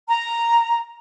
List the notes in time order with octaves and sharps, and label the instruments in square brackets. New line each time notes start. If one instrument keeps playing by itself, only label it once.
[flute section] A#5